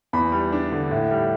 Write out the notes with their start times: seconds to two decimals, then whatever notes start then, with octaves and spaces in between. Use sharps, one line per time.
0.13 E2 B5
0.32 G3
0.52 D4
0.72 D3
0.91 A2
1.11 G3